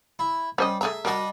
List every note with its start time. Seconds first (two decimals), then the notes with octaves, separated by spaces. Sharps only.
0.19 E4
0.58 G3 C#4 C5 D#5
0.81 A3 G#4 E5 A#5
1.05 G3 D4 F#4 A#4 D#5